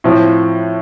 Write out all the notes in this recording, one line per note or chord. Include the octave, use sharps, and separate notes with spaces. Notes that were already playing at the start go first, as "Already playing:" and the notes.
A2 F3 C4